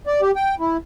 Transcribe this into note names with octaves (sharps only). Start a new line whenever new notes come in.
D5
G4
G5
E4